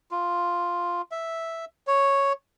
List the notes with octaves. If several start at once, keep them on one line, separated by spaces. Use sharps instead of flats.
F4
E5
C#5